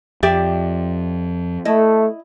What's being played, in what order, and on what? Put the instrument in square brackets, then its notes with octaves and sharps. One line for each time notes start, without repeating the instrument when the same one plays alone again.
[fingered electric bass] F2 [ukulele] G4 D5 E5
[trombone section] A3 [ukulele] E4 D#5